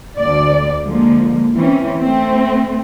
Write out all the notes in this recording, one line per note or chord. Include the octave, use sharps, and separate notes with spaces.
D2 D5
D3 F3 G#3 A#3
E3 C4 C#4
A3 C4